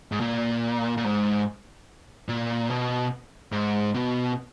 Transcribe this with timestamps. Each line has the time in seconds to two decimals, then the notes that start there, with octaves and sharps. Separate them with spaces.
0.12 G#2
0.20 A#2
0.97 A#2
1.04 G#2
2.29 A#2
2.69 B2
3.52 G#2
3.95 B2